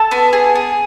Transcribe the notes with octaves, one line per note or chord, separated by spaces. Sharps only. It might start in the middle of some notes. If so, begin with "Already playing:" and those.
Already playing: A4
B3
G#4
G#4